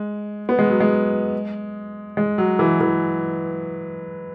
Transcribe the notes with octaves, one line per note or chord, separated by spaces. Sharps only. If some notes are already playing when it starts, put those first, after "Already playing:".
Already playing: G#3
B3
G#3
F#3
G#3
G#3
F#3
E3
E3